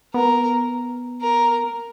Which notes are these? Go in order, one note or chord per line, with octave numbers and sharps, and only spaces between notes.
B3 A#4
A#4